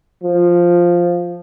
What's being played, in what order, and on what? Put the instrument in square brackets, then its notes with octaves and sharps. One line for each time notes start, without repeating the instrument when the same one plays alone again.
[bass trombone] F3